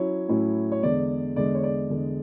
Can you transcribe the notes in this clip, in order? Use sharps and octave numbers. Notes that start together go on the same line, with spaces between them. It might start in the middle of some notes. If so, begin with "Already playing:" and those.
Already playing: F#3 C#4 E4 C#5
A2 F#3 C#4 E4
C#5
E2 D3 G#3 D5
E2 D3 G#3 D5
C#5
D5
E2 D3 G#3